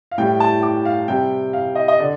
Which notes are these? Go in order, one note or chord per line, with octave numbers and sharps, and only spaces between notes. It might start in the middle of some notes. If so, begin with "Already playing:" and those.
F5
A2 G3 G5
A5
D6
F5
C3 G3 G5
F5
D#5
D#5
D3 D5